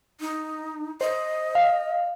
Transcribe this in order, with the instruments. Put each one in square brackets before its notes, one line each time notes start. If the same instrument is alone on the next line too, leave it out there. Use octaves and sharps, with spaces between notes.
[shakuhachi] D#4
[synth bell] C5 [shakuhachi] D#5
[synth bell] F5